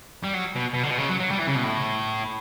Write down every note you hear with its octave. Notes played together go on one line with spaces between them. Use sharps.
G3
F#3
B2
B2
D3
B2
C#3
F#3
F#3
G3
E3
C#3
B2
A2